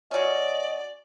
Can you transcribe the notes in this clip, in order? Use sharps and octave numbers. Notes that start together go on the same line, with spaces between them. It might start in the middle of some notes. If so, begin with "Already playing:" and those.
F#3 C#4 D5 D#5